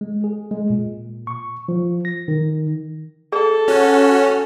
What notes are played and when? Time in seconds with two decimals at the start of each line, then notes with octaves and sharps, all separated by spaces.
0.01 G#3
0.24 G#4
0.51 G#3
0.70 A#2
1.27 C#6
1.69 F3
2.05 A#6
2.28 D#3
3.32 G#4 A4
3.68 C#4 F#4